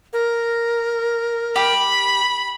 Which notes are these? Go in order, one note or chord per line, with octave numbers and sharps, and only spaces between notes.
A#4
G4 B5